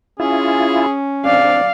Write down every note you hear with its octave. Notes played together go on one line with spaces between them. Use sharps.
C#4 E4 F4 G#4
C4 D4 D5 F5